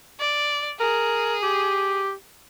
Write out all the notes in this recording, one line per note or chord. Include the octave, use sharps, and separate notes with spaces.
D5
G#4 A#4
G4